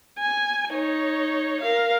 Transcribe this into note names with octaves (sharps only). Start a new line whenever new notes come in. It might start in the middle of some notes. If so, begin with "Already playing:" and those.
G#5
D#4 C#5
A#4 F5